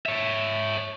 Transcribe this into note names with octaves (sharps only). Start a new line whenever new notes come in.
C#5 E5